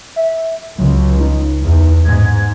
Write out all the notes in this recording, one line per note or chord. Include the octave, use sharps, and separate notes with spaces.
E5
C#2 F#3
D#4
E2
G#2 G#6